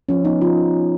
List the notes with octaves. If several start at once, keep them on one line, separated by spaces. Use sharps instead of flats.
F3 C#4
B3 D#4
F3 F4